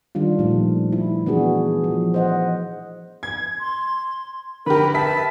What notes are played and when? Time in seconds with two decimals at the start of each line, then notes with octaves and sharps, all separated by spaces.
0.15 D#3 G3 D4 F4
0.39 A#2 F3 A3
0.92 E4
1.26 E3 B3 D4 F#4 G#4
1.84 F3
2.14 C5 D#5 F#5
3.23 G#6
3.60 C6
4.66 D3 G4 A#4 B4
4.94 E5 A5 B6